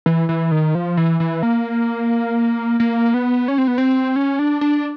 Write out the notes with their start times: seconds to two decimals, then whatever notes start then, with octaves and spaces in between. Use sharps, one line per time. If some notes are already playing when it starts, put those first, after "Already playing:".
0.06 E3
0.29 E3
0.51 D#3
0.75 F3
0.97 E3
1.20 E3
1.43 A#3
2.80 A#3
3.14 B3
3.48 C#4
3.58 C4
3.68 B3
3.78 C4
4.16 C#4
4.39 D4
4.61 D4